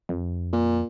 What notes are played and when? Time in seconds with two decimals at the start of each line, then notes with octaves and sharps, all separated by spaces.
0.09 F2
0.53 A#2